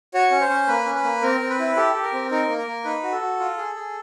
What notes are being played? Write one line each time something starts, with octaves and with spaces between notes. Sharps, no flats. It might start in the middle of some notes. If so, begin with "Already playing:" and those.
F#4 C#5
C#4
C5
C#4
A#3 B4
C#4
B4
A#3
C4 A#4
C4
B4
E4
G4 A4
G4
A#4
C4
D#4 A#4
A#3
A#4
A#3
D#4 B4
F#4
A4
F#4
F4
G#4
G#4